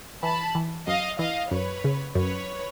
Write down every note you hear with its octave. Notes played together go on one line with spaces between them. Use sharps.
E3 A5 B5
E3
F#2 D#5 F5
E3 D#5 F5
F#2 B4 C#5
C#3
F#2 B4 C#5